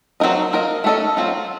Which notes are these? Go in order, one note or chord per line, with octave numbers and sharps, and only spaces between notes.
F#3 C4 D#4 A#4 D#5
A#3 F4 A#4 D#5
A3 C#4 A4 D#5
F#3 C4 F4